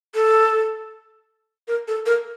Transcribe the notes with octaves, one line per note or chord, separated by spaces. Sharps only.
A4
A#4
A4
A#4